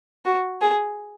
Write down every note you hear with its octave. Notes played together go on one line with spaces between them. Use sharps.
F#4
G#4